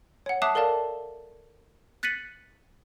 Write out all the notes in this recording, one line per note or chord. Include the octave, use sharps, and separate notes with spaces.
C#5 F#5
E5 A5 D6 D#6 F#6 C7
A4 A#4 D5 F5 A5
F#6 A6 B6 C#7 D#7 F#7